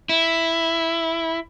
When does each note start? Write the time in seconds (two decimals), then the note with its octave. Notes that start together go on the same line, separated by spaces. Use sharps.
0.09 E4